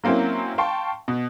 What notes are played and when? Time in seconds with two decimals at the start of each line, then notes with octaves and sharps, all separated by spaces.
0.04 F#3 A#3 C4 C#4 E4
0.58 F5 G5 A5 C6 C#6
1.08 B2